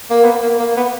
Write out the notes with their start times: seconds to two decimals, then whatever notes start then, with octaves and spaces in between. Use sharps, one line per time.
0.10 A#3
0.24 B3
0.42 A#3
0.59 A#3
0.77 B3